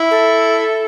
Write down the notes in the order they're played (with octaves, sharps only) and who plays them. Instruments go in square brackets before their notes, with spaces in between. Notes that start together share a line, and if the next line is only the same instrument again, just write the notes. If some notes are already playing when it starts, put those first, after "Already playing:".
Already playing: [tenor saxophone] E4
[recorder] A4